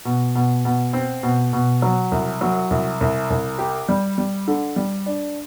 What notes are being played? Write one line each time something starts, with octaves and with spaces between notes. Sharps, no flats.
B2
B2
B2
C4
B2
B2
F#3
C2
F#3
C2
C2
C2
G4
G3
G3
D3
G3
D4